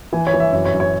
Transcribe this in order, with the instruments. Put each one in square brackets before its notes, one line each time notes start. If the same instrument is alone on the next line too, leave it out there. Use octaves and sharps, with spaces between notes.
[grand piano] E3 G#5
C#5
E3
E5
F#2 C#5
C#5
F#2
C#5